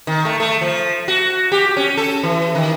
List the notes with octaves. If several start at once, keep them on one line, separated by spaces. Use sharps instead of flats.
D#3
A3
A3
F3
F#4
G4
C#4
A4
E3
D#3